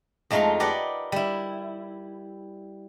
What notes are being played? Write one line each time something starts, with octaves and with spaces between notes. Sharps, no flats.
F2 G#3 A3 D#4 F5 C6
G4 A#4 B4 D5 D#5 F#5
G3 E4